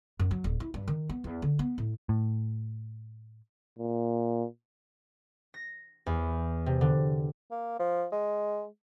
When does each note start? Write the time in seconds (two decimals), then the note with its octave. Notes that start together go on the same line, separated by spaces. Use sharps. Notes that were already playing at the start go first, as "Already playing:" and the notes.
0.19 F#2
0.31 F#3
0.44 D#1
0.60 E4
0.74 G2
0.88 D#3
1.09 B3
1.24 E2
1.42 D3
1.59 B3
1.78 A2
2.09 A2
3.79 A#2
5.54 A#6
6.06 E2
6.66 C3
6.81 D3
7.51 A#3
7.79 F3
8.12 G#3